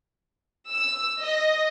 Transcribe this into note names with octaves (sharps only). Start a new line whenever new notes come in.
E6
D#5